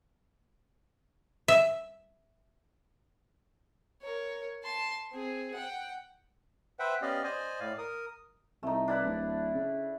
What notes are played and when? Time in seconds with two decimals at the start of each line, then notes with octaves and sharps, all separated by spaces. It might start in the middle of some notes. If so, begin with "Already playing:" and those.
1.48 E5
4.02 A#4 C#5
4.64 A5 C6
5.12 C4 G#4
5.54 F#5 G5
6.79 B4 C5 E5 F#5 G5
7.02 B3 C#4 G4 D5 D#5 F5
7.24 C5 D5 D#5 G#5
7.60 A2 D5 F5
7.78 A#4 D#6
8.63 C2 A3 D#4
8.88 D4 E4 B4
9.04 D1
9.55 C#3